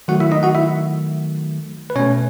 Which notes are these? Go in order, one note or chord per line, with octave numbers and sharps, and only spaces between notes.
D#3 F#3 A3 F#4 F#5
E4 E5
D#4 D#5
F#4 F#5
E4 E5
B4
B2 A3 C#4 C#5